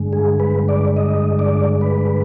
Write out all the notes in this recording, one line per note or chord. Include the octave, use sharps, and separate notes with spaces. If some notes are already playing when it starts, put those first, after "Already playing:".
Already playing: G2 D3 G#3
G#4
B4
D5
D#5
D5
B4